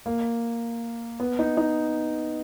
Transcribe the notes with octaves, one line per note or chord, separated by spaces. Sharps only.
A#3
B3
D#4
D#4